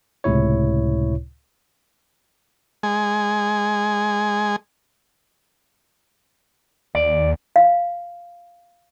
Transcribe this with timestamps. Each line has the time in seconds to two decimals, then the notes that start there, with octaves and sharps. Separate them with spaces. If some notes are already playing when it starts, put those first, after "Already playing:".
0.24 C#2 A2 C3 E4 C#5
2.83 G#3 G#5
6.95 D#2 D5
7.56 F5